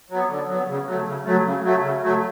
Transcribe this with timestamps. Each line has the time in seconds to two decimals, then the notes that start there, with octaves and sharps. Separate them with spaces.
0.10 F#3 B3
0.29 D3
0.48 F#3 B3
0.68 C#3
0.86 F#3 A3
1.06 C#3
1.25 F#3 A3
1.45 C#3
1.63 F#3 A3
1.82 C#3
2.02 F#3 A3